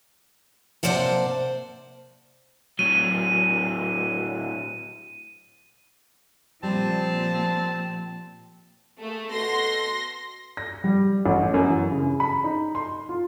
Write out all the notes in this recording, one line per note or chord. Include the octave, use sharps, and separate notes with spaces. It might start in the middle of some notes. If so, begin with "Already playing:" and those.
C3 A#3 C5 D5 F#5 A5
A2 F#3 D#7
A#2 F3 G3 C4 A5
A3 A#3 G#4
B2 F#4 A4 C6 A#6
A#6
G3
A1
F#2
E3
C#3
B5
D#4
C6
F4